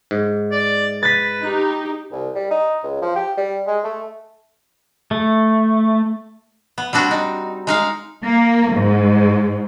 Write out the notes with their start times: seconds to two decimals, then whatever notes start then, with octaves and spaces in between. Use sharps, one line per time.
0.11 G#2
0.51 D5
1.03 B4 A6 B6
1.41 D#4 G4
2.11 C2
2.35 G3
2.51 D#4
2.83 C#2
3.02 F3
3.16 G4
3.37 G3
3.67 G#3
3.84 A3
5.11 A3
6.78 B3
6.93 G3 C4 D4 F#4
7.11 D#4
7.67 G#3 D#4 F5
8.24 A#3
8.74 G#2